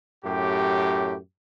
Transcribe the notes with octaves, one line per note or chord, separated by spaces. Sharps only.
F#2 A2 G4